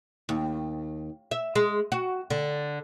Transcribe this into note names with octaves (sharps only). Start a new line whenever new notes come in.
D#2
E5
G#3
F#4
D3